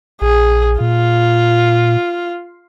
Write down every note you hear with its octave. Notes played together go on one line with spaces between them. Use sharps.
A#1 G#4
A#2 F4